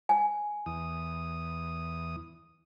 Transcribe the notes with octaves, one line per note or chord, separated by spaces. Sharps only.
G#5
E2 D#6